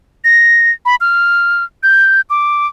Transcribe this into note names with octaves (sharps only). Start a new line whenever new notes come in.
A#6
B5
F6
G6
D6